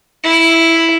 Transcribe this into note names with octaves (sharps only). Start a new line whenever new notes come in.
E4